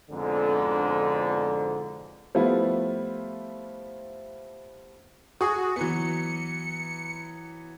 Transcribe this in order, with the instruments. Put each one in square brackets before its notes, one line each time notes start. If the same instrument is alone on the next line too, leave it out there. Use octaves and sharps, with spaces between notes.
[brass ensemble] F2 G#2 B2 D3
[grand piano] F3 G3 A3 B3 E4 F4
[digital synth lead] F#4 [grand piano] G#4 C#6 D#6
[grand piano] E3 F#3 B3 [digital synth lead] C#7